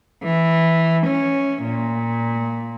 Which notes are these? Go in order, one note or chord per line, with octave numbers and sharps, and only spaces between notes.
E3
C#4
A#2